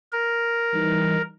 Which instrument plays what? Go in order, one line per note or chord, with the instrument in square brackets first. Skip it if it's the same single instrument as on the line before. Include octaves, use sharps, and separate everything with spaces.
[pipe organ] A#4
[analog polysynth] E3 G3 D#4